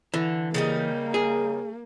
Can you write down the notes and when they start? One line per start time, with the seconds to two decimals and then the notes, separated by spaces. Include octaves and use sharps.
0.14 D3 E3
0.54 C#3 G3 A#3 D#4
1.14 G#4